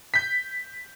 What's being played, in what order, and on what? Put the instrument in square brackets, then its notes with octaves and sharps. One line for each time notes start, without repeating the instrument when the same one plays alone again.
[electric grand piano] G6 B6